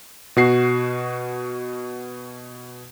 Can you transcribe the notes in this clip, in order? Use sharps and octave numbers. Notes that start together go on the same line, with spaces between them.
B2 F#4 C7